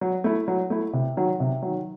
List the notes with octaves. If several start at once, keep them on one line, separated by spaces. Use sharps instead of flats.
F#3
A3 E4
F#3
A3 E4
C3
D#3 F#3
C3
D#3 F#3